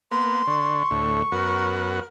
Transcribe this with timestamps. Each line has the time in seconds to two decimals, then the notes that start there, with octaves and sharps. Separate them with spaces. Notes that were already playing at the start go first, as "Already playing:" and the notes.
0.11 A#3 B3 C6
0.47 D3 C#6
0.91 D2 A2
1.32 F#2 B3 F#4 A#4